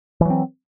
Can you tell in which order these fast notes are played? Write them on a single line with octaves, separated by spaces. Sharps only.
E3 F#3 C4